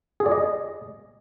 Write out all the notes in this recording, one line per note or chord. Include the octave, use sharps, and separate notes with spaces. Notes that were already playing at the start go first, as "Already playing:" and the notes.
G#4
D5
D#5